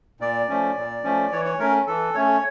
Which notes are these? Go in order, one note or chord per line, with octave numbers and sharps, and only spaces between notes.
A#2 D5
F3 A3 C#4
A#2
F3 A3 C#4
E3 C#5
C#5
A3 C#4 A#4
E3 A4
A3 C#4 C#5